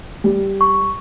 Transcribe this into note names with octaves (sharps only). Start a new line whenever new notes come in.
G3
C#6